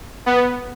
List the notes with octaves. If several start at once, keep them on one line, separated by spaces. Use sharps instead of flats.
B3